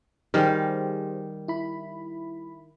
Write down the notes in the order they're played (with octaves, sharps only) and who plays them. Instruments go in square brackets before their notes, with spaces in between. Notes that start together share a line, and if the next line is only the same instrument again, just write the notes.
[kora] D#3 G3 F5 [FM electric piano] G4 G#4 C5
[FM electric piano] E4 B5